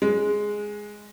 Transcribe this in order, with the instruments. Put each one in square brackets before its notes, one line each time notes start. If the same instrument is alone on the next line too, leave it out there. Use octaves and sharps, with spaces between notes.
[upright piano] G#3